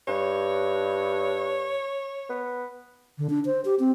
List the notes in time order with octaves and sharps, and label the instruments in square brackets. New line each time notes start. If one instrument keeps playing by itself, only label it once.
[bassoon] G2 [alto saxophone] C#5
[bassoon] B3
[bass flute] D3
D4
C5
G4
C4